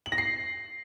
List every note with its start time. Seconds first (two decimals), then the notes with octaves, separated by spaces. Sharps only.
0.06 F#7
0.12 A#6
0.18 C7